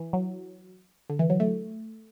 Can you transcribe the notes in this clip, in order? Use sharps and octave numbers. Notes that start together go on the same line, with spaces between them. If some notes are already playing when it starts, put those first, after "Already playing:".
Already playing: E3
F#3
D3
E3
F#3
A3